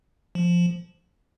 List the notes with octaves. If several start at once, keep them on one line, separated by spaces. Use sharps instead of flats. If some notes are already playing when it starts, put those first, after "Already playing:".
F3